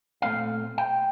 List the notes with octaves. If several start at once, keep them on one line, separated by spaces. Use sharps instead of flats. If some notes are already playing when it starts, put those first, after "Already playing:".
A#2 A3 C4 F5
G5